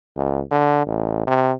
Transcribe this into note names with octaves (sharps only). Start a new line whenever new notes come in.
C#2
D3
A1
C3